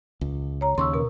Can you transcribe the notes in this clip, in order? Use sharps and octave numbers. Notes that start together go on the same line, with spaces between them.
C#2
C#5 A#5
D#2 C#3 C6 C#6 E6
B2 A#4